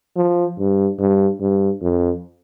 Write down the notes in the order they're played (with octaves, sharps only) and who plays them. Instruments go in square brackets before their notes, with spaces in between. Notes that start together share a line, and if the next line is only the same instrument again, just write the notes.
[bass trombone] F3
G2
G2
G2
F2